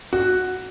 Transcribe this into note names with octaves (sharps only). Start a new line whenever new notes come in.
F#4